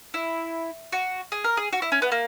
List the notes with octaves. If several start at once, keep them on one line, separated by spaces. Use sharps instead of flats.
E4
F#4
G#4
A#4
G#4
F#4
E4
C#4
B3
A#3